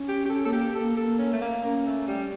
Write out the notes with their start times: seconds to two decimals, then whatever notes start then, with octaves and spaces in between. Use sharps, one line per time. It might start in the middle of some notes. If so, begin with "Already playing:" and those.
Already playing: C#4
0.08 G4
0.25 G4
0.29 C#4 A4
0.45 A#3 A4
0.52 G4
0.75 A4
0.80 A#3
0.97 A#3 A4
1.18 C#4
1.33 A3
1.41 A#3
1.63 A#3 C#4
1.86 A3
2.07 G3